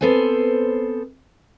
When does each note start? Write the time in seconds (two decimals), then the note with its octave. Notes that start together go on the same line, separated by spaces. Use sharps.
0.01 B3 C4 A4 C5 G#5